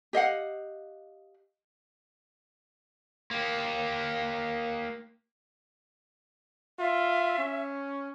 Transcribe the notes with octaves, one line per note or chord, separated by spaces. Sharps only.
G4 D#5 F5 F#5
A#3 G4
F4 E5
C#4